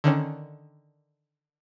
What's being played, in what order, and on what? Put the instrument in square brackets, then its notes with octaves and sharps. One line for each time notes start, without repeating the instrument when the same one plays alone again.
[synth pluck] D3 D#3 C#4